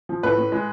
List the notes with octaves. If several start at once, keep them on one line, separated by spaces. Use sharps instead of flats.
F3
A2 B4
A2
G#3